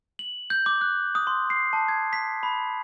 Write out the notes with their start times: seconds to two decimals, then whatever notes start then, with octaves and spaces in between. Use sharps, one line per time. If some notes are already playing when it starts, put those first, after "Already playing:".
0.19 F#7
0.50 G6
0.66 D6
0.81 F#6
1.15 D#6
1.27 C6
1.50 C7
1.73 A5
1.88 G#6
2.13 B6
2.43 B5